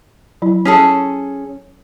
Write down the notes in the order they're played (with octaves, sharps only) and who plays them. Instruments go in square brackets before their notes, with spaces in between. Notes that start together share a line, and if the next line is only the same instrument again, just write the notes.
[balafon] F#3 E4
[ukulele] C#4 G#4 A4